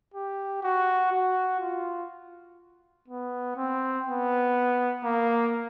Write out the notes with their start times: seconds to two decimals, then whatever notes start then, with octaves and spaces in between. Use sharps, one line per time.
0.14 G4
0.63 F#4
1.12 F#4
1.60 F4
3.08 B3
3.56 C4
4.06 B3
5.04 A#3